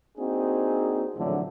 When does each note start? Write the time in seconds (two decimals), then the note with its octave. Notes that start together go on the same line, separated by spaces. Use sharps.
0.18 A#3 C4 D4 D#4 F#4 G#4
1.17 A#1 F2 A2 D3 E3 F#3